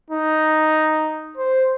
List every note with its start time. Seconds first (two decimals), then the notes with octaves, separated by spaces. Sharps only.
0.10 D#4
1.37 C5